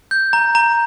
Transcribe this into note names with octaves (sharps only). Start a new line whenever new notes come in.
G6
A#5
A#5